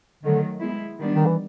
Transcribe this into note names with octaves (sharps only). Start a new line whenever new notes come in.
D3 D#3 F#3 A3
G#3 B3 E4
D#3 G3 B3 D4
D#3
E3